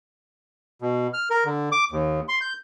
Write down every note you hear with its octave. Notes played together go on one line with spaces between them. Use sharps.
B2
F6
A#4
D3
D6
D#2
C6
G6